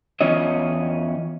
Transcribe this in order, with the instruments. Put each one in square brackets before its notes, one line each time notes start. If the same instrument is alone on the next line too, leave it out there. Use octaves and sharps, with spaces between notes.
[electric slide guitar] E2 E3 C#4 F4 C#5 D#5